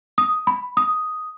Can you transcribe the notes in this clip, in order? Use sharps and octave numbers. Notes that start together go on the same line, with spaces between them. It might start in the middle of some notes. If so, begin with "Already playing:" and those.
D#6
B5
D#6